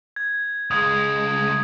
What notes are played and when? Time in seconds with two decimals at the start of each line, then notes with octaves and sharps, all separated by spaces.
0.16 G#6
0.71 C#2 G#3 D#6 G#6